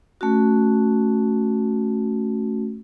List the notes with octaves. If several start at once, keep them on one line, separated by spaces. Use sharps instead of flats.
A3 C#4 F#4